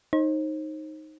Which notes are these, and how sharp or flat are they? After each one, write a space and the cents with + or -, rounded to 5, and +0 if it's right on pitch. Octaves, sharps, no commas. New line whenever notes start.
D#4 +0 C5 +40